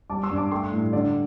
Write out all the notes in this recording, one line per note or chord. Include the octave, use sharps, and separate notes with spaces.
G3 A5 D6
C6 E6
G2
A5 D6
A3 G5 C6
A2
D3 D5